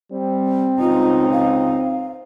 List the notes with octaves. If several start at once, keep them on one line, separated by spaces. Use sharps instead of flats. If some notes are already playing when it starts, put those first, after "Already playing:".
G3 C4
C#2 D#4 F4
F5